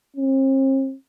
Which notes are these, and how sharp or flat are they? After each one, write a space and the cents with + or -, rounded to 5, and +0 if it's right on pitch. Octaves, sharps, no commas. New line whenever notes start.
C4 +40